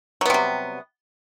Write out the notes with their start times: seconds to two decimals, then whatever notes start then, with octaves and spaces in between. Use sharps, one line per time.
0.21 F#3
0.25 B3
0.30 C3
0.34 G3